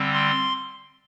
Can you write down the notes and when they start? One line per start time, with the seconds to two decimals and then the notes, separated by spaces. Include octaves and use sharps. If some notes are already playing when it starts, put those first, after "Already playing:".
Already playing: D3 G3 C4
0.12 C6